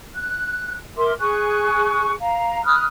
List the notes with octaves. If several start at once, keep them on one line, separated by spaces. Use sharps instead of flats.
F#6
A#4 E5 C6 D6
G#4 G#5 C#6 F#6
F5 A#5
B5 D#6 F6 F#6